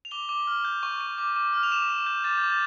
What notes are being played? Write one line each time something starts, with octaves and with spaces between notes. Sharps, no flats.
F7
D6 G7
D6
F6
G6
C#6
C#6
D6
D6
F6
F7
D6 E7
D6 E7
G6
D6 A6
G6
D6
A6